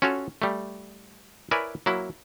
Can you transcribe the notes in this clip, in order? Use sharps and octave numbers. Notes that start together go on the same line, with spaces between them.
C#4 F4 F#4 A4 C#5
G3 A3
E4 A#4 B4 C#5 D5 G#5
F#3 A#3 E4